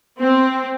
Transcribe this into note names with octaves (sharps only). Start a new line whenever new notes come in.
C4